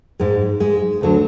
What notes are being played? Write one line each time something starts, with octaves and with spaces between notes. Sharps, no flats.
G#2 G#3
G#2 G#3
D2 D3 F#3